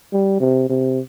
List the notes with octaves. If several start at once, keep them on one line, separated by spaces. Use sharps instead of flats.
G3
C3
C3